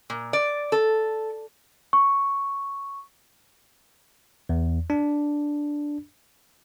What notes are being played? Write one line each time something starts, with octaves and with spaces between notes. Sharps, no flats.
A#2
D5
A4
C#6
E2
D4